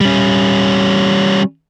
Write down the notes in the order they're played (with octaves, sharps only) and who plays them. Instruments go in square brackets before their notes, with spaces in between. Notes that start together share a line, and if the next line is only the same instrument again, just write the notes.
[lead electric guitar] G3 C#4